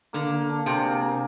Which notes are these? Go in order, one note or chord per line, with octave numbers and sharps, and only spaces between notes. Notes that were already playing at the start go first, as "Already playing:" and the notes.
D3 A#3
A#3
D4
C3 G#4
A#3
A#3